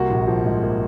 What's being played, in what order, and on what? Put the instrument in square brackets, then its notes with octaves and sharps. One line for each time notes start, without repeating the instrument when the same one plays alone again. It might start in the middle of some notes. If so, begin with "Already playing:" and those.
Already playing: [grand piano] C2 A#3 F#4
A#1
F3
G#2
A#3